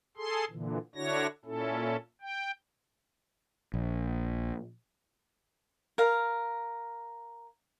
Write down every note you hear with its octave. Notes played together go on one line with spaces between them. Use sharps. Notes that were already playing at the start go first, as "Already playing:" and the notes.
G#4 A4 C6
A#2 D3 E3
D3 D4 E4 F#4 C#5 A#6
A#2 C#4 E4 A4
G5
A#1
A#4 F5